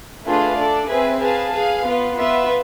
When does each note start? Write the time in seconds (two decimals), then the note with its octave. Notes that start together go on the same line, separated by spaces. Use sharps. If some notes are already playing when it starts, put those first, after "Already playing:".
0.25 A3 D4 F4 G#4 B4
0.57 D4 A4 D5
0.88 C4 G#4 B4 E5 G#5
1.19 G#4 B4 F5 A5
1.52 G#4 B4 F5
1.84 B3 F4 B4
2.15 B3 F4 B4 E5